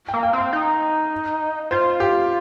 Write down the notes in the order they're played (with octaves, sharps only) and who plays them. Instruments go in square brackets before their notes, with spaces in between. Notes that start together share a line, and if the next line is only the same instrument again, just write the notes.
[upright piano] G5
[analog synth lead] A#3
[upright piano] G5
[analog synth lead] C4 [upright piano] F5
[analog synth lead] D#4
[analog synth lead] F4 [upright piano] C5
[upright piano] G4